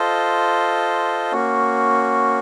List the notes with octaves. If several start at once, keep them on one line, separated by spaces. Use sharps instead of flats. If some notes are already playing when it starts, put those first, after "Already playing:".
Already playing: F4 A4 C5 D#5
A#3 C#4 F#4